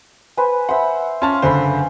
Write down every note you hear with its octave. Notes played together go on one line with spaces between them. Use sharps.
B4 C5 G#5
C5 E5 F#5
C#4 F4 A5 F6
F#1 D3 C5 G#5 B5